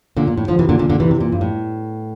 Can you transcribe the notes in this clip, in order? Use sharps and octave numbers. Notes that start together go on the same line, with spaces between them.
A#2 D3
A#2
A2
D3 F3
C3 E3
A#2 D3
A#2 D3
A#2 D3
C3 E3
C3
A#2
G2
A2